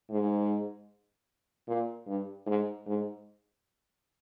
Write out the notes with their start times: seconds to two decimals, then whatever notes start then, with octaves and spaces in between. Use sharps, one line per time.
0.10 G#2
1.68 A#2
2.07 G2
2.47 G#2
2.87 G#2